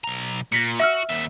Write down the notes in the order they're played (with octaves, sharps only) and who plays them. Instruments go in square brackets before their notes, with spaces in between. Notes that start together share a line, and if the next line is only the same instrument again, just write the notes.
[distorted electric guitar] B1 A#5
[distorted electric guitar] A#2 [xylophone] A#6 B6 C#7
[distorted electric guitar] F#4 [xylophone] E5 E6 F6
[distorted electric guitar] D#2 E5